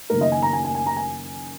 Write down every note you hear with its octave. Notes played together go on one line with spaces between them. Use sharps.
F#1 F#2 D#3 A#3 A#4
D#5
G#5
A#5
G#5
G#5
G#5
A#5
G#5